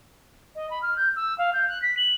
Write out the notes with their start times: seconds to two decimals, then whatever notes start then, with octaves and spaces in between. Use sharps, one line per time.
0.55 D#5
0.70 B5
0.82 F6
0.96 G6
1.16 E6
1.38 F5
1.53 G6
1.68 F#6
1.82 B6
1.97 F#7